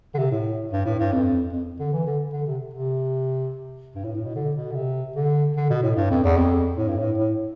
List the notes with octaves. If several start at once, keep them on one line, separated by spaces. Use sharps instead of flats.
D3
C3
A2
G2
A2
G2
F2
F2
D3
E3
D3
D3
C3
C3
G2
A2
A2
B2
D3
B2
D3
C3
D3
D3
B2
A2
G2
F2
E2
F2
A2
G2
A2
A2